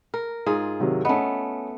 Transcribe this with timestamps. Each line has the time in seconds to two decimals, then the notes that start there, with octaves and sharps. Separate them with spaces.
0.14 A#4
0.47 G#2 F4 G#4
0.80 C3 D#3 F#3
1.05 A3 B3 C#4 D#5